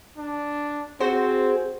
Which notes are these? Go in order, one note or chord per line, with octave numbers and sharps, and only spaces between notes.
D4
C4 F#4 G#4 C5